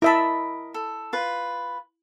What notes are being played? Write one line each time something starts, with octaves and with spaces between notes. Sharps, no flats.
E4 A#4 D#5 E5 A5 B5
A4
F4 B4